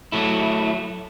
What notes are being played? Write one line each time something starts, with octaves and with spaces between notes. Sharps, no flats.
F#3 A3 E4